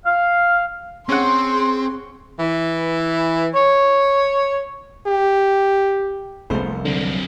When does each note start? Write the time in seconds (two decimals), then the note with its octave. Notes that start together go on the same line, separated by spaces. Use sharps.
0.05 F5
1.09 C4 C#4 G#4 F#5 C6
2.40 E3
3.54 C#5
5.07 G4
6.50 F1 C2 G#3 A3 B3 C5
6.85 D3 F#3 C4